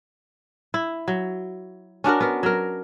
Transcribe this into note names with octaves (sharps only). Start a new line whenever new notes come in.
E4
F#3
C#4 D4 F#4 A#4
B3 A#4
F#3 A#4